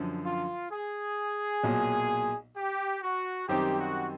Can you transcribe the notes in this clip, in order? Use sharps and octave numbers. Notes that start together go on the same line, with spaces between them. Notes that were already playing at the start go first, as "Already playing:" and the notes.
Already playing: F#2 D3 F3
F4
G#4
B1 A#2 F#3
G4
F#4
F#2 D#3 G3 C4 D#4 G4
F#4